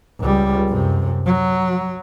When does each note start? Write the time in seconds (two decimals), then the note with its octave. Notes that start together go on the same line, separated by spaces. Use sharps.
0.20 C#2 G3
0.68 F#2 C3
1.26 F#3